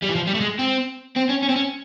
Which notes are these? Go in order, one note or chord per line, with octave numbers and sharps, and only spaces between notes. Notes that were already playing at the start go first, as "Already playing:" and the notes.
G3
E3
F3
G3
A3
G#3
C4
C4
C#4
C#4
C4
C#4